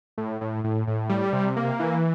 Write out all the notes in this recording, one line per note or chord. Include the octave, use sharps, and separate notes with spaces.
A2
A2
A2
A2
G3
C3
A#3
E3